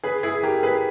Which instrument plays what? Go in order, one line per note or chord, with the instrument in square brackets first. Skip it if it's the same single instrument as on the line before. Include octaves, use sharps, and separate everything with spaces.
[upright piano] G#4 B4
E4 G#4
G4 A#4
G#4 B4